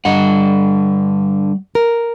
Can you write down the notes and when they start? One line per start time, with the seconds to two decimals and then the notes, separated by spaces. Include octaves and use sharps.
0.05 G2 D3 G3 D#5 F#5
1.75 A#4